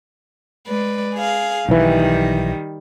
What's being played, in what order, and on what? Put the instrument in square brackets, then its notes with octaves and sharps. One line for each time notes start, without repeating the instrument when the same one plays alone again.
[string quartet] G#3 B4 D5
G#4 F5
[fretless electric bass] B1 E3 [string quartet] D#3 G3